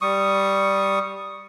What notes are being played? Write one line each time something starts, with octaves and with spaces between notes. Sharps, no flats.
G3 C#6 D#6